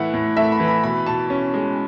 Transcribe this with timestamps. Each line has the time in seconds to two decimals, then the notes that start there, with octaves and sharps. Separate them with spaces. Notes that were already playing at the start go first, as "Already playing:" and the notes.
Already playing: A2 E3 A3 E4 F#5
0.14 A2
0.37 A3 E5
0.52 B5
0.60 E3
0.68 B5
0.84 B2 B5
1.06 B2 A5
1.30 C#4
1.54 G#3